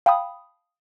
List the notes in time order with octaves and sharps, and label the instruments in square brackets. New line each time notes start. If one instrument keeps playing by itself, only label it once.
[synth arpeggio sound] F5 G5 A5 B5 D#6